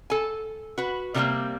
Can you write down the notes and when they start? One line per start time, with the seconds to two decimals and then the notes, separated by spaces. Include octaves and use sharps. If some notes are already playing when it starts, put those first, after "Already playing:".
0.10 A4 G#5
0.78 F#4 B4
1.14 C3 D#3 F#3 G3 A#3 C4